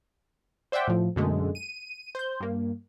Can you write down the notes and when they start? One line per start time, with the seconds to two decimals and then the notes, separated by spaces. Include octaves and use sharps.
0.72 C5 D5 E5 F#5 G5
0.88 A2 F3
1.16 F#2 B2 D3 G#3 A3
1.55 D#7
2.15 C5 G6
2.40 G2 A#3